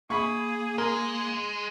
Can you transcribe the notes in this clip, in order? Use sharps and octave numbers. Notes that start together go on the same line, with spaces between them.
A#3 G#4 B5 C#6
G#3 A#4